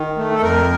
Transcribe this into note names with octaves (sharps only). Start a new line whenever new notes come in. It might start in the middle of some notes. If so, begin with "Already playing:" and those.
Already playing: D#3
A3
A4
F2 A#4